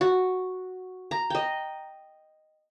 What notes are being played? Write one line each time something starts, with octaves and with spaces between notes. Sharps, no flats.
F#4
A#5
D#5 G5